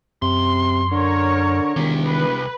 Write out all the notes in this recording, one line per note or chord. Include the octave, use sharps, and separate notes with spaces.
F#2 C3 C6
D3 A#4 C#5
E1 C2 D#3 G4
B4